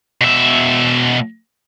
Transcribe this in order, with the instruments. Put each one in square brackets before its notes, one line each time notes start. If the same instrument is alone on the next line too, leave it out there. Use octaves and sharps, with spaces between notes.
[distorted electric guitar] B2 E5